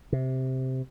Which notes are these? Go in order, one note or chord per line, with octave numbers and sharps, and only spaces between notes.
C3